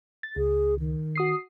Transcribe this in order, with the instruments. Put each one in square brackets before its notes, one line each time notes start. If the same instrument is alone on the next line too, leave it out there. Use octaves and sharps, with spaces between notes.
[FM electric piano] A6
[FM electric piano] C#2 [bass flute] G#4
[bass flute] D#3
[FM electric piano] F#4 D#6 C7